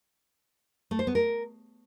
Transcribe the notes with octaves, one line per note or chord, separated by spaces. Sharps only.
A3
C5
B3
A#4